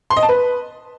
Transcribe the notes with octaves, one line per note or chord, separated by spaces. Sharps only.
C6
D#5
A5
B4